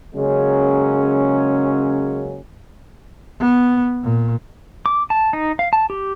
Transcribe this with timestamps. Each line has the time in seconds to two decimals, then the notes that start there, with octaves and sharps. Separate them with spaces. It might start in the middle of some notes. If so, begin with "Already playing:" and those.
0.15 C#3 F#3 G#3 A#3 C#4
3.40 B3
4.04 A#2
4.86 D6
5.10 A5
5.33 D#4
5.59 F5
5.73 A5
5.90 G4